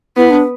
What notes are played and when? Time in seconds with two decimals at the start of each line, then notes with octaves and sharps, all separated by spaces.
0.17 B3 E4
0.30 D4